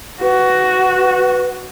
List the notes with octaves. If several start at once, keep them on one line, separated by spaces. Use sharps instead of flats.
F#4 B4